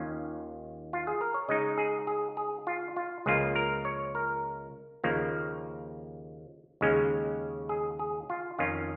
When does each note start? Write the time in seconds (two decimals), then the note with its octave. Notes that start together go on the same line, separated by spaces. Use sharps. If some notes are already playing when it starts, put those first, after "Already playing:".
Already playing: D#2 D#3 C#4 F4
0.93 F4
1.07 G#4
1.21 A#4
1.34 C#5
1.48 C#3 G#3 D#4 D#5
1.78 G#4
2.07 G#4
2.37 G#4
2.67 F4
2.96 F4
3.26 C#2 C#3 F3 A#3 F4 G#4
3.56 A#4
3.85 C#5
4.15 A#4
5.04 D#2 C#3 F3 A#3
6.81 D#2 C#3 G#3 C#4
7.69 G#4
7.99 G#4
8.30 F4
8.59 F2 D#3 C#4 F4